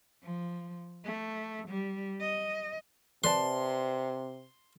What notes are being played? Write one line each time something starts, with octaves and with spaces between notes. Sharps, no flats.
F3
A3
G3
D#5
C3 B4 D5 A5 C6